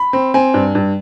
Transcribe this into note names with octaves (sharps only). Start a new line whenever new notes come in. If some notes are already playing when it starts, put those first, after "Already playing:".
Already playing: B5
C4
C4 G#5
G2
G2